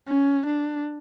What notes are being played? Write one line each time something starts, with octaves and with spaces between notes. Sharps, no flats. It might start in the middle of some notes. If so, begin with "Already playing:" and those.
C#4
D4